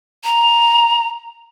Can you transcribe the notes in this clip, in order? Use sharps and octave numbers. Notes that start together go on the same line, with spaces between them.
A#5